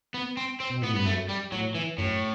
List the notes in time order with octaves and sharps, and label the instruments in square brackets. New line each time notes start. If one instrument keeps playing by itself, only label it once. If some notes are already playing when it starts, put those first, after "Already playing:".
[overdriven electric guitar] B3
C4
C4
[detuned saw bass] B2
[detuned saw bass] A2 [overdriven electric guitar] B3
[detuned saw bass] G2 [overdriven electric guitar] B3
[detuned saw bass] F#2 [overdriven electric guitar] A3
[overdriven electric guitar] G3
[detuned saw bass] A2 [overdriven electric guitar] F#3
[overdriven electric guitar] E3
[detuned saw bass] F#2 [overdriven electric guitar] A2